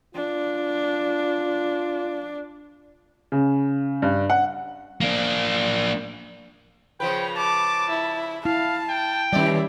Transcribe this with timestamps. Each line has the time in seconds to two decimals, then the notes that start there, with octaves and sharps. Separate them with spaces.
0.15 D4 F4
3.32 C#3
4.02 G2
4.30 F#5
5.01 A#3 D4
7.00 C#3 F3 B4 G5
7.37 A5 D6
7.89 E4
8.45 E4 F5 A5
8.89 G5
9.33 D#3 G3 C#4 E4 D5